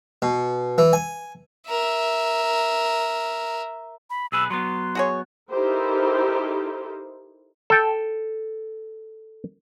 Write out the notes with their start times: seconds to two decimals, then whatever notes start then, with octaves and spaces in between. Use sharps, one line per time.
0.22 B2
0.78 E3
0.93 G#5
1.69 A#4 E5
4.10 B5
4.32 B1 G#4 B4 E6
4.50 F#3 B3 C6
4.95 F#4 G#4 C#5
5.50 D#4 E4 G4 A4 A#4 C5
7.70 A4 G5